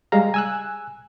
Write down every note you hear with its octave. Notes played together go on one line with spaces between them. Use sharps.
G3 G#3 F5 A#5
G#5 E6 F#6